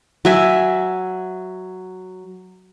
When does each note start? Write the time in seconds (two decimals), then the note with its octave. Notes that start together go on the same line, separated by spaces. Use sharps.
0.25 F#3 E5 G#5